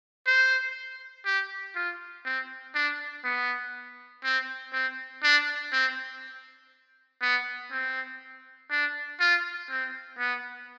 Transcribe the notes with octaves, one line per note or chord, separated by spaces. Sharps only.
C5
G4
F4
C4
D4
B3
C4
C4
D4
C4
B3
C4
D4
F4
C4
B3